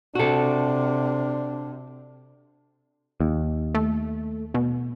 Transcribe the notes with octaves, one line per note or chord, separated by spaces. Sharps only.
C3 D4 F#4 A4
D#2
A3
B2